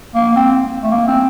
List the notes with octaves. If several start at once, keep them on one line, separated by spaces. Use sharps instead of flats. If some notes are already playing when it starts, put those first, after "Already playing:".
A#3
C4
A3
A#3
C4